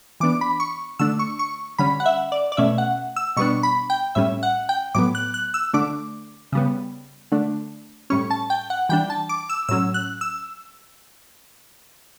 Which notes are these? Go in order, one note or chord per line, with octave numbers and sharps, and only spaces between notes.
E3 B3 D4 D6
B5
C#6
D3 A3 D4 E6
C#6
C#6
D3 G3 C#4 B5
F#5
E5
D5
D5
B2 A3 C#4 E5
F#5
E6
B2 G3 B3 D4 C#6
B5
G5
A2 G3 C#4 E5
F#5
G5
A2 F#3 B3 D6
F#6
F#6
E6
D3 A3 D4 D6
C#3 G3 B3
D3 A3 D4
A2 G3 C#4 C#6
A5
G5
F#5
E3 G3 D4 G5
A5
D6
E6
A2 F#3 C#4 E6
F#6
E6